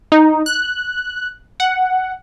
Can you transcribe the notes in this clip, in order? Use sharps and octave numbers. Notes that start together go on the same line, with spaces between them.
D#4
F#6
F#5